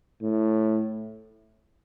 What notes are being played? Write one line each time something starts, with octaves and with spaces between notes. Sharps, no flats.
A2